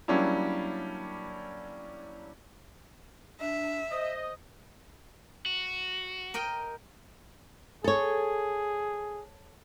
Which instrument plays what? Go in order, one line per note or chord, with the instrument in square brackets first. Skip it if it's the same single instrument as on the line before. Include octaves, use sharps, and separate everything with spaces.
[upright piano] F#3 G3 A#3 C#4 D4 E4
[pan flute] D4 [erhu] E5
[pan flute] C5 [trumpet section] D#5
[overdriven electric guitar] F#4
[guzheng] A#4 D#5 G5
[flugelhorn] G#4 [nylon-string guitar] A4 C#5